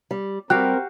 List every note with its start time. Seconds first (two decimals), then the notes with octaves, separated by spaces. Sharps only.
0.11 G3
0.50 G3 C4 F#4 G4 A#4 F5 G5 F#6